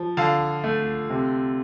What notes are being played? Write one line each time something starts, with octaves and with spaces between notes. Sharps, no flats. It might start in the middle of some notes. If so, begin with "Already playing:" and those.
Already playing: F3
D3 F5 A5
A3
C3